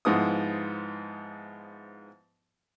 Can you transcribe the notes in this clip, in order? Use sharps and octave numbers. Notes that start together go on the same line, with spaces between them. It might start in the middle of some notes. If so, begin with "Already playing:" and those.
G#2 F3 B3 E4 D#6